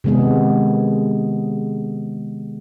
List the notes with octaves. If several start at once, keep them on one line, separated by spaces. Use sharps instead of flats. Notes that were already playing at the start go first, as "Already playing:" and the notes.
C3 D#3 G#3 B3 G#4